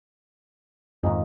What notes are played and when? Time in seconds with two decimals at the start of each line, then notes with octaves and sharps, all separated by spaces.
1.03 F2 G#2 D#3 D#5